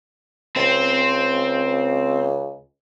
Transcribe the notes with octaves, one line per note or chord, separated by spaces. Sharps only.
C#2 C4 C5